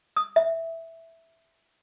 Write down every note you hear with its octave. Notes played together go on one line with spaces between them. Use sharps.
D#6
E5